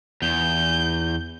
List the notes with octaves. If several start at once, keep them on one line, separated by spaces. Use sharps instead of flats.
E2 G6